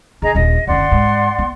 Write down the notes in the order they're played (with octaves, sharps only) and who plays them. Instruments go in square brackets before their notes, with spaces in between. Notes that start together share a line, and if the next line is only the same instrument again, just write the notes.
[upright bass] D3 [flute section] G#4 D#5 A#5
[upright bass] D#1 A#1 [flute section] D#5
[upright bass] F#1 D3 [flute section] D5 F#5 C6
[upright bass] G#2
B3